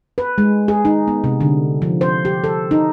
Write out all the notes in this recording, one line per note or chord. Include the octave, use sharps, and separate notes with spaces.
B4
G#3
G#4
D#4
B3
C3
D3
F3
C5
G4
A4
D#4